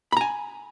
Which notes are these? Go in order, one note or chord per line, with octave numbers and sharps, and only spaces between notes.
G#5 A#5 B5